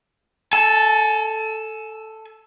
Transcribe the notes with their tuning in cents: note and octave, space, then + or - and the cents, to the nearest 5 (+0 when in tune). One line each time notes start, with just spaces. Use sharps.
A4 +0 G#5 +35